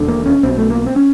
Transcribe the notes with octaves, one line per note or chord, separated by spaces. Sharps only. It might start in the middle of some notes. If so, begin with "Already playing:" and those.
Already playing: E1 D#2 D3
A#3
C#4
B1 B2 C4
A3
A#3
C4
C#4